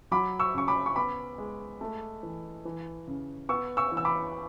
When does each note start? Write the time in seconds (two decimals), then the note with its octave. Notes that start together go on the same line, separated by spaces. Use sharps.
0.11 F#3 B5 D6
0.40 C#6 E6
0.54 C#3 C#6
0.68 B5 D6
0.86 C#6
0.96 B3 B5 D6
1.38 G#3
1.81 A3
2.23 E3
2.65 E3
3.08 C#3
3.49 B3 C#6 E6
3.77 C#6 E6
3.92 E3
3.97 E6
4.05 B5 D6